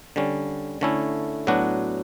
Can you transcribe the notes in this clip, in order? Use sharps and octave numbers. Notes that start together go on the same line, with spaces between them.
D3 G3 C#4
D3 A3 C#4 E4
A2 F#3 B3 D4 F#4